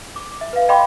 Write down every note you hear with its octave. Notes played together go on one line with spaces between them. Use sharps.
D6
E5
B4 F5
D#5 F5 G5 B5 C6 D6